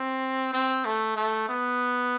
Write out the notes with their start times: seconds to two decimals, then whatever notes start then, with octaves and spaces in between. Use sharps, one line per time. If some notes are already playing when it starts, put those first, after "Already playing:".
Already playing: C4
0.53 C4
0.85 A3
1.16 A3
1.49 B3